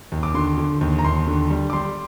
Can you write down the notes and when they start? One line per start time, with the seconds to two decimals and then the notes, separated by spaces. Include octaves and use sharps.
0.12 D#2
0.23 D6
0.34 D3 C6
0.58 D3
0.81 D#2
0.99 A#5
1.05 D#2 C6
1.27 D3
1.51 G3
1.70 D6
1.73 G3 C6